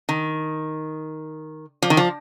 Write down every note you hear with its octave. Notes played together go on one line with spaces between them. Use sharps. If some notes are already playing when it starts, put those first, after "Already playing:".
D#3
F3
D#3
F3